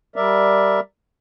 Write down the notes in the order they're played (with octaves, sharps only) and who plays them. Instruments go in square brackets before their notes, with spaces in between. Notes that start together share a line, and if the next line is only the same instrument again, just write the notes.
[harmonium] G3 A#4 D5 E5